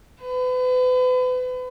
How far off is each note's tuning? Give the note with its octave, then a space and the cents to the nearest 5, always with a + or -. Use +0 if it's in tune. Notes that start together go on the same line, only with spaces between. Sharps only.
B4 +35